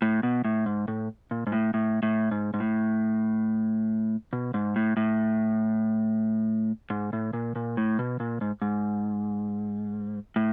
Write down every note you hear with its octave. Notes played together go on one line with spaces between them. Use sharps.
A2
B2
A2
G#2
A2
A#2
G#2
A2
A2
A2
G#2
G#2
A2
B2
G#2
A2
A2
G#2
A2
A#2
A#2
A2
B2
A#2
G#2
G#2
A2